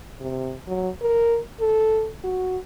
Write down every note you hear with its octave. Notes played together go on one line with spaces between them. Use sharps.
C3
F#3
A#4
A4
F#4